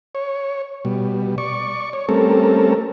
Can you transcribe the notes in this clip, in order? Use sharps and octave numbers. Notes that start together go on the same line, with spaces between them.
C#5
B2 G3
D5 C#6
C#5
G3 A3 C4 C#4 A4 A#4